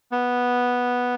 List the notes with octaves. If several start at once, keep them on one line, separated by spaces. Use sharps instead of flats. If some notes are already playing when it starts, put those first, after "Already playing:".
B3